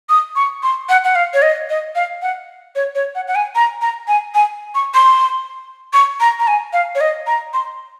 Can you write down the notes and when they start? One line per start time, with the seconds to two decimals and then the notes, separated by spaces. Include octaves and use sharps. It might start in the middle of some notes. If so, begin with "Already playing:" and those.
0.09 D#6
0.36 C#6
0.63 C6
0.89 F#5
1.04 F#5
1.15 F5
1.34 C#5
1.42 D#5
1.70 D#5
1.95 F5
2.22 F#5
2.75 C#5
2.95 C#5
3.15 F#5
3.27 F#5
3.35 G#5
3.55 A#5
3.82 A#5
4.08 G#5
4.34 G#5
4.75 C#6
4.94 C6
5.93 C#6
6.20 A#5
6.39 A#5
6.47 G#5
6.73 F5
6.95 C#5
7.01 D#5
7.27 A#5
7.53 C6